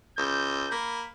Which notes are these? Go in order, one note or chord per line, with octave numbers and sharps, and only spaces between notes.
C#2 G6
A#3 B5